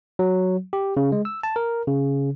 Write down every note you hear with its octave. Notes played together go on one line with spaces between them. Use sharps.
F#3
G4
C#3
G#3
E6
A5
A#4
C#3